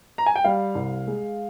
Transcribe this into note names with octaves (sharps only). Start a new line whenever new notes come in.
A#5
G#5
G5
G3 F5
C2
G#3